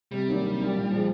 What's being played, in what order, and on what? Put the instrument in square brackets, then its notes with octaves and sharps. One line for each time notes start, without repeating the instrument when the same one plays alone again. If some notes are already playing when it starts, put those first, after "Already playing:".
[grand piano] C3 [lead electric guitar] G3
[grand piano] D#3 F#3 A#3 D4
C3
D#3 F#3 A#3 D4
A#2
F3 G#3